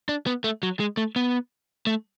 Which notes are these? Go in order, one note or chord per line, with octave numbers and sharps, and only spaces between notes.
D4
B3
A3
F#3
G#3
A3
B3
A3